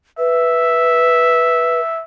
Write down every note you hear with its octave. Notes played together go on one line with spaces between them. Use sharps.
B4 E5